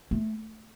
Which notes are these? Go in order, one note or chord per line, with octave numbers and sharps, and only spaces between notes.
A3